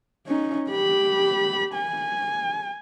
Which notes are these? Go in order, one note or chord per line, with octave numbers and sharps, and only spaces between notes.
C#4 D#4
G4 B5
G#5